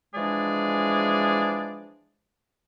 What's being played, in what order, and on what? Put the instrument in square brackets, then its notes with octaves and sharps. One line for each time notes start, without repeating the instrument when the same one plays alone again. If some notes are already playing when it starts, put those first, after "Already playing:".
[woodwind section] E3 F3 G#3 D4 G#4 D5